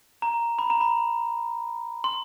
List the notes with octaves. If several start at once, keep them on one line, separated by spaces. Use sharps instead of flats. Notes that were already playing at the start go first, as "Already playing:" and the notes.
A#5
B5
A#5
B5
C6